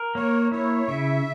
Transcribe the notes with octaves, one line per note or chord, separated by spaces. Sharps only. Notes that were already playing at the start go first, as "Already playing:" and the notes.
Already playing: A#4
A#3 C#5
E4 C#5
C#3 E5